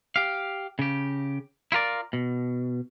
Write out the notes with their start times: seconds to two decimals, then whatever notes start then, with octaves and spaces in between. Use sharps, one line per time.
0.16 G4 F5
0.79 C#3 G4
1.72 E4 F4 A#4 D5
2.13 B2